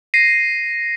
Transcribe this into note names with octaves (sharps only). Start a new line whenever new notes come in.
A#6 C7 D#7